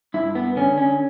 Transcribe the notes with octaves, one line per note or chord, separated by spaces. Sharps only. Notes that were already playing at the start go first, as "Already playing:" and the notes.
G2 E4
B3
D3 C#4
C#4